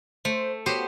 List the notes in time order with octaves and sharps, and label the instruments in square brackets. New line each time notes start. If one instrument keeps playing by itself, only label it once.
[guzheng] A3 [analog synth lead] C5
[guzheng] B3 G4 C5 [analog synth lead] F#4